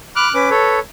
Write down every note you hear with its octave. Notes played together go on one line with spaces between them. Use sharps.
B5 D6 F6 F#6
C#4 B4 D6
A4 C#5